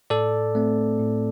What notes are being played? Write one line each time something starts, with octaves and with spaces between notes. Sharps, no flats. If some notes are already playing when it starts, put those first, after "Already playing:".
A2 A4 D5
A3 C4
A2